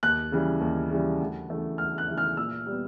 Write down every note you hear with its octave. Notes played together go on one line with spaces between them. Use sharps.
D#2 F#6
C#3 E3 G3
D#2
C#3 E3 G3
D2
C#3 E3 A3
D2 F6
F#6
C#3 E3 A3
F6
A#2 E6
G3
B3